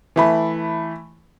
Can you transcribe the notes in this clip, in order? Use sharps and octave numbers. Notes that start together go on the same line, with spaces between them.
E3 A3 B5